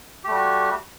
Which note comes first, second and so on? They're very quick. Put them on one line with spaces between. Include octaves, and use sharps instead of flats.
G4 A3 G3 F#4